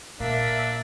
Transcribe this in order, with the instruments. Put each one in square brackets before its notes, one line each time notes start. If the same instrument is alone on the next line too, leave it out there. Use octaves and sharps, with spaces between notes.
[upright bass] A#2 [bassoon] A#3 [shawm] D4 [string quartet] E5